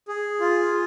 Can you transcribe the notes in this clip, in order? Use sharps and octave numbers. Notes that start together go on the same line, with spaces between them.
G#4
F4